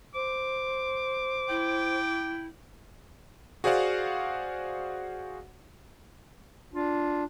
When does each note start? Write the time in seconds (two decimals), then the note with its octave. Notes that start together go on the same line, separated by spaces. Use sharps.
0.15 C5 D6
1.49 E4 G5
3.64 F#4 G#4 C5 D5 F5 F#5
6.74 D4 F4